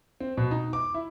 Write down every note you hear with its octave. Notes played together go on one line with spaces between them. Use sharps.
C4
B2
D#4
D6
E4